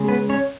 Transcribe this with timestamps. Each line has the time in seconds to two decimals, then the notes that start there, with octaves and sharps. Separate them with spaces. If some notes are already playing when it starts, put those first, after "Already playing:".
Already playing: C#3 G#3
0.08 B3 B4
0.29 C#4 C#5